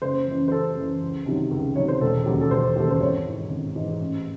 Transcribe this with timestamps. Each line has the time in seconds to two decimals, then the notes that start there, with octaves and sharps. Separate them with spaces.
0.02 F#1 C5
0.27 F#2 E3
0.48 C5
0.51 F#1 A4
0.76 F#2 E3
1.01 C#2
1.26 C3 D#3 F#3
1.51 C#2
1.76 C3 D#3 F#3 C#5
1.88 C5
2.01 E1 A4
2.26 D#2 C#3 F#3
2.41 A4
2.51 E1 C5
2.76 D#2 C#3 F#3 A4
2.91 C5
3.00 G#1 C#5
3.25 G#2 E3
3.50 G#1
3.76 G#2 E3
4.00 A1